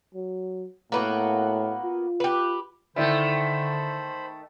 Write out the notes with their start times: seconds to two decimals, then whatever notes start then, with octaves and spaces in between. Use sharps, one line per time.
0.14 F#3
0.92 A2 A#3 B3 F#4
1.84 F4
2.20 G4 B4
2.96 D3 D#3 A3 E4 C5 D5 E5 B5